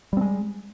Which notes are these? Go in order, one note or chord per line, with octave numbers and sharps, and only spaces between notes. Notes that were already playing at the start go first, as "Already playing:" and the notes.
G3 G#3 C4